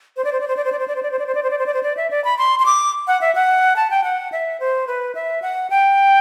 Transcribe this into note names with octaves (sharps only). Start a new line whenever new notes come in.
C5
D5
C5
D5
C5
D5
C5
D5
C5
D5
C5
D5
C5
D5
C5
D5
C5
D5
C5
D5
C5
D5
E5
D5
B5
C6
C6
D6
F#5
E5
F#5
A5
G5
F#5
E5
C5
B4
E5
F#5
G5